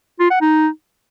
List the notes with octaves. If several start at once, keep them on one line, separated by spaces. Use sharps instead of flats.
F4
F#5
D#4